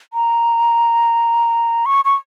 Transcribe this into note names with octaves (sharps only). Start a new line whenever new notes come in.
A#5
C#6
C#6